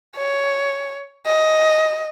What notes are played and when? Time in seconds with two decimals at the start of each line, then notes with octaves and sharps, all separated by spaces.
0.16 C#5
1.26 D#5